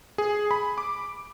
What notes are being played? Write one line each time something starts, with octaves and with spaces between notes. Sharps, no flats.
G#4
B5
D6